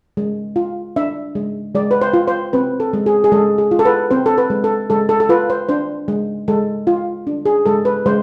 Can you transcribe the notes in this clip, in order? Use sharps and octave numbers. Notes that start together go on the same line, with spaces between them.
G#3
F4
D4 E5
G#3
G#3 D5
B4
C5
F4
C5
C4 B4
A4
G#3
G#4
G#4
G#3 A4
G#4
F4
A4
B4
C4 C5
A4
B4
G#3
A4
G#3 A4
A4
A4
F4 B4
C5
D4 C5
G#3
G#3 A4
F4
D4
G#4
G#3 A4
B4
G#3 C5